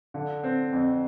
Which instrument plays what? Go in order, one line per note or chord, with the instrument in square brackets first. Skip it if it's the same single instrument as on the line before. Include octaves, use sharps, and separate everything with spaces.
[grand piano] D3
C4
F2